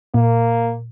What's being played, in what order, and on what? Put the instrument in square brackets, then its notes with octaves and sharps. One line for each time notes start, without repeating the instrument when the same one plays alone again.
[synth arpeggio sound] A#2 [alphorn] A#3